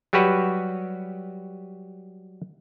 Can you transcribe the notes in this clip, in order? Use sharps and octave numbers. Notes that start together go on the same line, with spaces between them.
F#3 G3 F#4 G4 B4